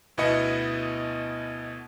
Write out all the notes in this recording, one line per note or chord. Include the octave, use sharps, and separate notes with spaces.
D2 B2 B3 E4 D#5 C#7